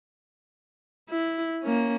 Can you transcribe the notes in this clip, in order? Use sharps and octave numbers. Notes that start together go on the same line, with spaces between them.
E4
A#3 C#4